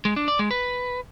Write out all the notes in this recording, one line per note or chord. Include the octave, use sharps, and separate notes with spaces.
G#3
D4
D5
G#3
B4